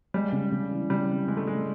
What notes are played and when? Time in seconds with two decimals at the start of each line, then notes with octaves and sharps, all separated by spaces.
0.14 G3 G#3
0.32 C#3
0.52 C#3
0.71 E3
0.90 C#3 G3
1.09 C4
1.27 C#3 G#3
1.37 A3
1.47 G#3 C4